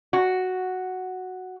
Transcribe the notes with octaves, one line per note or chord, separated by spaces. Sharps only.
F#4